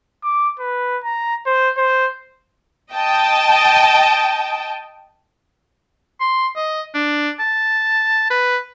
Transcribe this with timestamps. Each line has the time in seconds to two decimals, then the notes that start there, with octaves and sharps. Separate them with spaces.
0.24 D6
0.60 B4
1.04 A#5
1.46 C5
1.78 C5
2.93 D#5 G5 A5
6.20 C6
6.56 D#5
6.94 D4
7.39 A5
8.30 B4